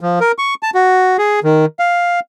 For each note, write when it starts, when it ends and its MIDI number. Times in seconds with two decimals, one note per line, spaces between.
0.01 0.19 53
0.21 0.32 70
0.38 0.54 85
0.63 0.70 81
0.75 1.17 66
1.18 1.40 68
1.44 1.65 51
1.79 2.20 77